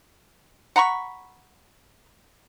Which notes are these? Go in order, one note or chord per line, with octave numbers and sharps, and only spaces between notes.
F#5 A#5 B5 C#6